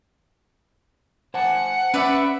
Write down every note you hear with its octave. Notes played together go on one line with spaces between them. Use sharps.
C5 F#5 G#5 A5
C#4 B4 D5 E5